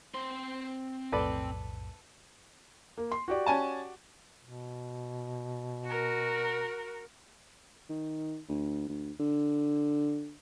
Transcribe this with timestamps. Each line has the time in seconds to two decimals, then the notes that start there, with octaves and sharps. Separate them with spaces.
0.14 C4 C5 C6
1.12 B1 F2 A2 A4 B4 D5
2.97 A#3
3.12 C6
3.28 F#4 G4 D5
3.46 C#4 G#5 A5
4.42 B2
5.84 F#4 A#4
7.89 D#3
8.49 D2
8.89 D2
9.20 D3